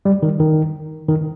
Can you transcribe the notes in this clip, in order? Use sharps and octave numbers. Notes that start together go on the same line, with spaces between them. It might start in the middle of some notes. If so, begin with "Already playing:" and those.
G3
D#3
D#3
D#3